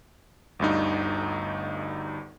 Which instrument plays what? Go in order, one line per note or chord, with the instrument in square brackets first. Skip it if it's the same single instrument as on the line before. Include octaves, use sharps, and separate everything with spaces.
[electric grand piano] G1 D2 G2 D#4